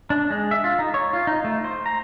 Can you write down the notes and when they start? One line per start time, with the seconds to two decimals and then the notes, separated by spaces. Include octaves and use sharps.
0.10 D4
0.30 G#3
0.51 E5
0.64 F4
0.79 D#4
0.94 C#5
1.13 F4
1.27 D#4
1.44 A3
1.64 C5
1.86 A#5